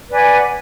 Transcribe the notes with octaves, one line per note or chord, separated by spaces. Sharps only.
B4 D5 F#5 G#5